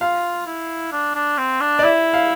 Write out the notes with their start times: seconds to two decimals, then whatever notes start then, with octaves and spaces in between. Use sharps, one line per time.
0.01 F4 F5
0.46 E4
0.92 D4
1.14 D4
1.38 C4
1.61 D4
1.79 D5
1.83 E4 E5
2.13 F5